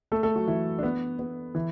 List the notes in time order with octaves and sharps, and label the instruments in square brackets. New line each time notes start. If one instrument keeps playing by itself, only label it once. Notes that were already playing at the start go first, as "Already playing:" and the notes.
[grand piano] A3 A4
A3 A4
F#3 F#4
E3 E4
D4
B3
B3
E3 E4